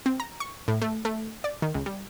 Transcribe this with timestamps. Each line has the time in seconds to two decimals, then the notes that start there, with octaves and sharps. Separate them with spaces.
0.06 C4
0.20 A#5
0.40 C#6
0.68 A2
0.82 A3
1.05 A3
1.44 D5
1.62 D#3
1.74 C#2
1.86 G3